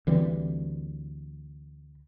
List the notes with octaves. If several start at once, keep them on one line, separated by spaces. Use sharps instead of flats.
D2 E3 G3 C4